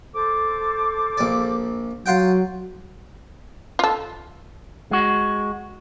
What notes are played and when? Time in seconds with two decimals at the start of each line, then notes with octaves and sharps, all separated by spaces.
0.13 A4 C5 D6
1.18 A#1 D5
2.06 F#3 F4 F#5 G5
3.79 F4 A4
4.91 G#3 F#4